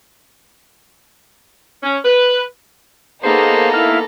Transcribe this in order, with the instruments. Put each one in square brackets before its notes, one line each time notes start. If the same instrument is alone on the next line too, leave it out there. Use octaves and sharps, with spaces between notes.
[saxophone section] C#4
B4
[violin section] A#3 B3 D#4 [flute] G#4 [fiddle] A4 A#5 [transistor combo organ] C5
[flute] E4 [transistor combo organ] F5